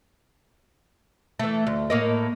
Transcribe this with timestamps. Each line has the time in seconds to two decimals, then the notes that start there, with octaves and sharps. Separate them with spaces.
1.39 E3 A3
1.67 D2
1.90 A2 A#3 D#5